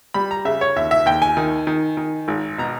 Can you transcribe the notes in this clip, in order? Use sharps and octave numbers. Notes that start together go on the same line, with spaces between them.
G3 B5
A#5
C#3 E5
C#5
D#2 E5
E5
D#2 G5
G#5
D#3
D#3
D#3
G#1
B2 A#5